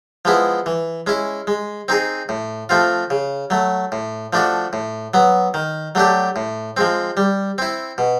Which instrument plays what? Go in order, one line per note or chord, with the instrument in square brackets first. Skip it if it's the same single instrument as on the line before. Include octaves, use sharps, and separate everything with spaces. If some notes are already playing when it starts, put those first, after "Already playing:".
[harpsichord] F3 G#3 B3 E4
E3
G#3 C#4 E4
G#3
C4 D#4 G#4
A2
F3 A3 C4 F4
C#3
F#3 A3
A2
F3 A3 D4 F#4
A2
F#3 B3
D#3
F#3 A3 D4 G4
A2
F3 G#3 C4
G3
C4 E4
B2